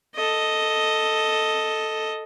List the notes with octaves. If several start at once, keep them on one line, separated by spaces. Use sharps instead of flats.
A4 D#5